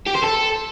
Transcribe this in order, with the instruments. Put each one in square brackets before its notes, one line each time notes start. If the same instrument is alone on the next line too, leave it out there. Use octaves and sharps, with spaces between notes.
[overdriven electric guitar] G4
C5
A4